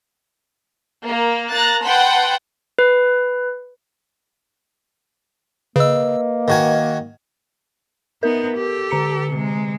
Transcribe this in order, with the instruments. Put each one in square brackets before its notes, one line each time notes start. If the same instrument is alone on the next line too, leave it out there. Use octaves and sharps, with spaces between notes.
[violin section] A#3
A#3 A#5 F#6 A6
B4 F#5 G5 A5 B5 C6
[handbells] B4
[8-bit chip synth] C#3 E6 [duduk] A#3 [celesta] B4 D#5
[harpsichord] D#3 F#4 G#5
[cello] B3 D#4 [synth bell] A#4
[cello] G4 A4
[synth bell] D3 A#5 C#7
[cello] C3 G#3